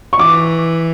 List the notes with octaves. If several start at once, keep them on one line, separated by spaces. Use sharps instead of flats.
C#6
E3 D6